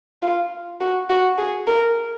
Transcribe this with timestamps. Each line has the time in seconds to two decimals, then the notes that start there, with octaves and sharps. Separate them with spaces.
0.23 F4
0.81 F#4
1.09 F#4
1.38 G#4
1.67 A#4